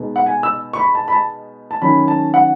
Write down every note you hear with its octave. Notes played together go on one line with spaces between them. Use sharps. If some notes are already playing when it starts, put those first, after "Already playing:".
Already playing: B2 G#3 D#4
F#5
G#5
E6
C#6
B5
A5
B5
A5
A5
D#3 F#3 C#4 B5
A5
F#5